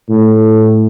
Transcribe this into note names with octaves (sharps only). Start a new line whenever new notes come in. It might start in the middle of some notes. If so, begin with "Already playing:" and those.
A2